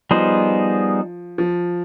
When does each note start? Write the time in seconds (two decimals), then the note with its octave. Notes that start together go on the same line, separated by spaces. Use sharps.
0.11 F3 G3 B3 D#4 G#4 C5
1.38 F3